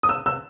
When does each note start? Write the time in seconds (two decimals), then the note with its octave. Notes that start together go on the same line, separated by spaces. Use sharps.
0.03 D#6
0.09 E6
0.26 E6